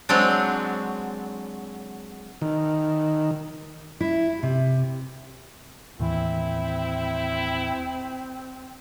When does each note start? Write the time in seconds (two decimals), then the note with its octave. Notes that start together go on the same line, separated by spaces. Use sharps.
0.09 F#3 G#3 C4 D4
2.42 D#3
4.01 E4
4.43 C3
6.00 D#2 A2 E3 C4 E4